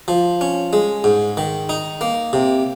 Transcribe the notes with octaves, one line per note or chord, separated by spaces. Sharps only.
F3
C#4
G#3
G#2
D#3
D#4
A#3
C3